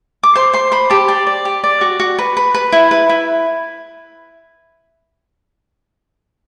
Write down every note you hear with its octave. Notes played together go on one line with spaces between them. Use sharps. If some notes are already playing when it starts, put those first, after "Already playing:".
D6
C5 C6
C5 C6
C5 B5
G4 A5
D5 G5
D5
G4
D5
F#4
F#4
B4
B4
B4
E4
B4
E4